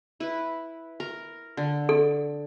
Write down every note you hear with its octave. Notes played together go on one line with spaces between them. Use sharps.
E4 B4
A#4
D3
A4